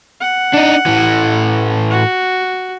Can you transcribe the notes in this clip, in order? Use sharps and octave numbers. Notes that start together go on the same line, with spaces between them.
F#5
D4 D#4
A2 E3
F#4